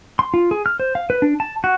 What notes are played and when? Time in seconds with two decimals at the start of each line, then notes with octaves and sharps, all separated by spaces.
0.19 C6
0.34 F4
0.51 G#4
0.66 F6
0.80 C5
0.95 F5
1.10 B4
1.22 D4
1.40 A5
1.64 F#4